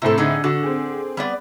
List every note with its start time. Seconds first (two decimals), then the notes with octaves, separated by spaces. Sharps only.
0.02 A2 C3 C4 E4 A4
0.18 D3 D#4 G#4
0.44 D3 F#4
0.63 C4 G#4
1.17 G3 B3 D5